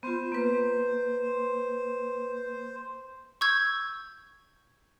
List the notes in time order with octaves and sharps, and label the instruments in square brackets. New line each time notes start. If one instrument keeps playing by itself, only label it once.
[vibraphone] B3 F4 [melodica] C5
[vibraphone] A#3 B4
[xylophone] C#6 E6 G6 G#6